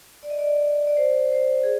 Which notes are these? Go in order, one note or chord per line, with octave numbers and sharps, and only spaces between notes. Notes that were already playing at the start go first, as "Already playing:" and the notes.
D5
D#5
D5
D5
C5
C5
G#4